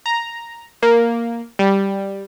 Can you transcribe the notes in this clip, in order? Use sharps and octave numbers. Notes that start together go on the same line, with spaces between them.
A#5
A#3
G3